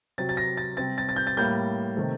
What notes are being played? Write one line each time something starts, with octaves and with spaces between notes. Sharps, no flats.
C3 F#3 C4 A6
A6
A#6
A6
C3 G3 C4 A6
A6
A6
G6
A6
A2 G3 A#3 G6
C3 D#3 A3 C4